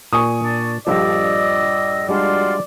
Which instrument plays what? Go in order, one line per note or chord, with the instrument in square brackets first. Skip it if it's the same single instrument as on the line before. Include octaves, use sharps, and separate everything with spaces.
[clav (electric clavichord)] A#2 [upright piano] G#5 C#6 D#6
[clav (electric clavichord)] A#2 [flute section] D4
[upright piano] A#1 G2 F3 [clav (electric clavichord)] A4 [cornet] D5 [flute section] D#5 E6
[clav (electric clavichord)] G3 G#3 D4 [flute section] F4 F#4 C6 [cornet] D5